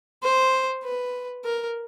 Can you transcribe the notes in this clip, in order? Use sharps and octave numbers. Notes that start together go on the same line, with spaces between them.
C5
B4
A#4